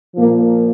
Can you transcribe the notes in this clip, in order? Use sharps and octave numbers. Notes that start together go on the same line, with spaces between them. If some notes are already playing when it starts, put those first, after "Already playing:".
A#2 F3 A#3